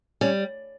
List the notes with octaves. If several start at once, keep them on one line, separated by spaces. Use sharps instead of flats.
G3 C#4